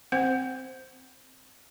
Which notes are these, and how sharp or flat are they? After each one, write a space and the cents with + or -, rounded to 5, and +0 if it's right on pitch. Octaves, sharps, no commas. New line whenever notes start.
C4 +0 C5 +0 F#5 +0